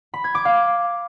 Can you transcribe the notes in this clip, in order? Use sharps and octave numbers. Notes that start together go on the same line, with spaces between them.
B5
G#6
D6
F5